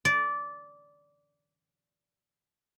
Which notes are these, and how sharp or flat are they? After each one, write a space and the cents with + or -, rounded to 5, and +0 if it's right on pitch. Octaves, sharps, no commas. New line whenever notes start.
D5 -15